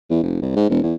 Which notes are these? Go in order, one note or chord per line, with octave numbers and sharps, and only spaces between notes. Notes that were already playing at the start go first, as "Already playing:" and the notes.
E2
F1
C2
G#2
E1
E2